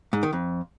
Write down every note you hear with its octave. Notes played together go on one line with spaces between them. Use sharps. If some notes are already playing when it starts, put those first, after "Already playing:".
G#2
D#3
F2